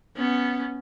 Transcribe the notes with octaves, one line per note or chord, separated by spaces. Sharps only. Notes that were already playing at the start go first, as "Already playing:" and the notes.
B3 C#4